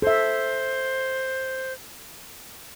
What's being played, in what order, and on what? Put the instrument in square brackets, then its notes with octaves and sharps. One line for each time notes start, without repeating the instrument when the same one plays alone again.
[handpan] A4 E5 [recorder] C5